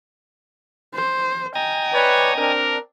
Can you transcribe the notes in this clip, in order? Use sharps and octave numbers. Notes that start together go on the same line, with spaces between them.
C5
D#5 G5 G#5 A#5
B4 C#5 D5
C4 D4 A#4